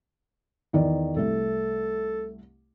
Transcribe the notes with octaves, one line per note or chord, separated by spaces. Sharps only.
E2 D#3 D5
C2 A3 A4